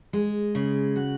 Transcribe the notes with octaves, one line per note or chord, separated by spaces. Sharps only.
G#3
C#3
F#4